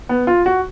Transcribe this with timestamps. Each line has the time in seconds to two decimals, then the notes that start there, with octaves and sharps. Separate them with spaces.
0.09 B3
0.27 F4
0.46 F#4